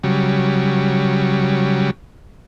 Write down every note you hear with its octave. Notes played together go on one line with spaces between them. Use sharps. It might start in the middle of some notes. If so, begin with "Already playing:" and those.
C#3 F#3 G3